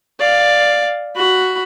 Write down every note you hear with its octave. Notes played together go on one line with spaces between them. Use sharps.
D5 F5
F#4 B5